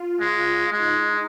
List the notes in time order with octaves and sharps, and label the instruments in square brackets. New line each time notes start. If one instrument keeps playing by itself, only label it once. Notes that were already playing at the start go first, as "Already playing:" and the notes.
Already playing: [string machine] F4
[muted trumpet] G#3 [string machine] F4
[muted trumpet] G#3 [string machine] D#4